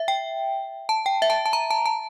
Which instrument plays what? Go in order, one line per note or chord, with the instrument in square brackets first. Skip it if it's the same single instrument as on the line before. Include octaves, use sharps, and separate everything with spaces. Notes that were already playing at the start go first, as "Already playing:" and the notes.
Already playing: [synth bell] E5
G5
A5
G5
E5
A5
A5
A#5
A5
A5